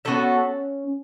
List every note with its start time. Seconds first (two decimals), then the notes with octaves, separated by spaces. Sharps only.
0.05 B3 C#4 F#4 A4 E5